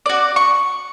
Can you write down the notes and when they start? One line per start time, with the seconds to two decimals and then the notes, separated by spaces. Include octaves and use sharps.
0.06 F#4 D5
0.36 C#6